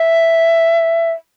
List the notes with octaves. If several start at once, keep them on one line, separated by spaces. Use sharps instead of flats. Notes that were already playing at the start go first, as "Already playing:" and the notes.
Already playing: E5